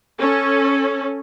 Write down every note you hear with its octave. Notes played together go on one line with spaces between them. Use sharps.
C#4 A4